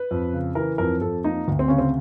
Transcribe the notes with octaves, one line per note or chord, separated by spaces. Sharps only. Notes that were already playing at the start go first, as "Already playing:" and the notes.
Already playing: B4
F2
C#3
E3 A#4
F2 A#4
F2 A4
A#3 D#4
D2
C4
C#3 C#4
C4